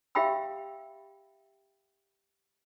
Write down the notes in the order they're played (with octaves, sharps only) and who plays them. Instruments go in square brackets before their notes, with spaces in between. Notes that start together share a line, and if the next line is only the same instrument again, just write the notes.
[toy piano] G4 E5 F5 G5 B5 E6